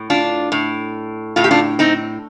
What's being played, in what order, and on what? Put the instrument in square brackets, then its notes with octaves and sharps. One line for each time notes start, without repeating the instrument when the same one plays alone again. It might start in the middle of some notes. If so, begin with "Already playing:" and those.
Already playing: [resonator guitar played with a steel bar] A2
D4 F4
A2
A2 F4
G4
D4 F4
C4 D#4